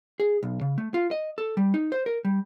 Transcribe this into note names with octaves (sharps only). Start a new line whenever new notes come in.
G#4
B1
C#3
A3
F4
D#5
A4
G3
D#4
C5
A#4
G3